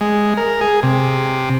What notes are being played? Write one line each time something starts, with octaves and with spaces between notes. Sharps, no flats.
G#3
A#4
G#4
C3